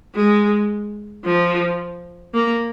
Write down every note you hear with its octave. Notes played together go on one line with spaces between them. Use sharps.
G#3
F3
A#3